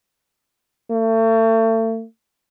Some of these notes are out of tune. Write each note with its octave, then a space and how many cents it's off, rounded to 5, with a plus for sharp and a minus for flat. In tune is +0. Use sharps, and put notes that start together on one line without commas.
A3 +35